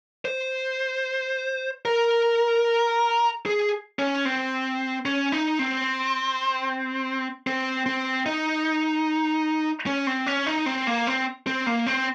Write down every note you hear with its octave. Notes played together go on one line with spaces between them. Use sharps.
C5
A#4
G#4
C#4
C4
C#4
D#4
C4
C4
C4
D#4
C#4
C4
C#4
D#4
C4
A#3
C4
C4
A#3
C4